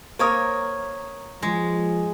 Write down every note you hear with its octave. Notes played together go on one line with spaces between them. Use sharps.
A#3 A#4 C5 C#5 D6 D#6
F3 G#3